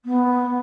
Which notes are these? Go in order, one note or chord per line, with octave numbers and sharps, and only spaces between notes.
B3